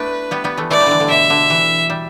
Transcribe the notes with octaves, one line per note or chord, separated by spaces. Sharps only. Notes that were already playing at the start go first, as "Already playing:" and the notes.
Already playing: A3 B3 D4 E4 B4
G3 B3
G3 B3
E3 A3
E3 A3 D5
G3
D3 E3
D3
B2 E5
D3
E3
G3